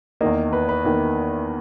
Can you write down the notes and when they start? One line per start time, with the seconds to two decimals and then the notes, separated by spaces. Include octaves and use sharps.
0.21 E2 D#3 A#3 D#5
0.53 B4
0.69 B4
0.85 E2 D#3 A#3